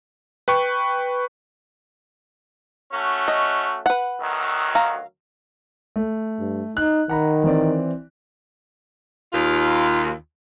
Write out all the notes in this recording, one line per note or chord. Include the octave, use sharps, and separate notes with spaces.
B4 G5 C#6
A3 C#4 F#4
D#5
B4 F#5
D2 D#3 F#3
F5 A#5
A3
G2
D#4 F#6
D#3 F#5 A#5 B5
E3 C4 D5
D#2 F4